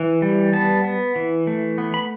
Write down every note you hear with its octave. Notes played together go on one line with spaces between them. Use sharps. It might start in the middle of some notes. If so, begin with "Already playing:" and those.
Already playing: E3
G3
B3 A5
B3
E3
A3
B3
B5